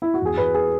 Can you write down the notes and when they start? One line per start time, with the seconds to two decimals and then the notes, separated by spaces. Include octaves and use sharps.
0.02 E4
0.14 F#4
0.22 E2 G#4
0.38 E2 B4
0.54 G#4